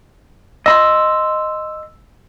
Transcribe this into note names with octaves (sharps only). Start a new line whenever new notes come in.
D#5 B5 C6 E6